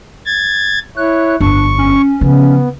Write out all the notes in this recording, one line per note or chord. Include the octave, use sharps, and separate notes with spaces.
G#6 A6
E4 C#5 F#6
G1 F2 D4 C#6
C#4
C#3 F3 B3